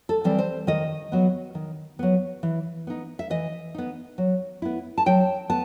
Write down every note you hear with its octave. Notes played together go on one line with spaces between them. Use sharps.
A4
E3 G3 C4
C5
D#3 D#5
F#3 B3
D#3
F#3 B3
E3
B3 D#4
E5
E3 D#5
B3 D#4
F#3
B3 E4
A5
F#3 G5
B3 A5